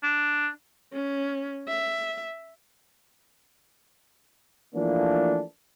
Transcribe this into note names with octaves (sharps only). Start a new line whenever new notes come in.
D4
C#4
E5
E3 F3 A3 A#3 D4